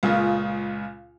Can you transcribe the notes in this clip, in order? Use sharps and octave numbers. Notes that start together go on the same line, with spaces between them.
C#2 A#2 C#3